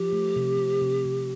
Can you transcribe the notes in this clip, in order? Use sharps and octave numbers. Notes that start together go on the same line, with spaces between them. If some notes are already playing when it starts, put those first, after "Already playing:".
Already playing: F3 G4
A3
C3
C4
C3
C3